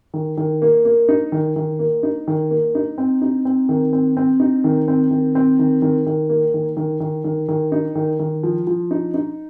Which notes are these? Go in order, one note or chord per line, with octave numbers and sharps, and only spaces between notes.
D#3
D#3
A#3
A#3
D#4
D#3
D#3
A#3
D#4
D#3
A#3
D#4
C4
D#4
C4
D#3
C4
C4
D#4
D#3
C4
D#3
C4
D#3
D#3
D#3
A#3
D#3
D#3
D#3
D#3
D#3
D#4
D#3
D#3
F3
F3
D#4
D#4